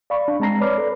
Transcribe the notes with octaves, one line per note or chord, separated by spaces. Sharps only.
D5 F5 B5 C#6
D4
G#3 C4 A5 A#5 A#6 C7
B4 C#5 D5 B5 D6 F6
A4 B4 D5